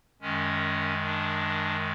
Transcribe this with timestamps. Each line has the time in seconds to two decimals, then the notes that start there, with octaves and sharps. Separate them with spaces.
0.21 F#2 D#3 G#3 C#4
1.04 D4